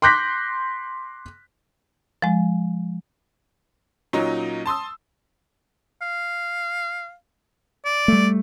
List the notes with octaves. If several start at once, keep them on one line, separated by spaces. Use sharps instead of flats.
C6 D6 F#6 G6 A#6 B6
F3 G#3
A#2 F#3 C#4 D#4
A5 C6 D#6 E6
F5
D5
G3 A3